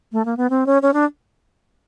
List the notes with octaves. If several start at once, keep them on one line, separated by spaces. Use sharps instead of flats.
A3
A#3
B3
C4
C#4
C#4
D4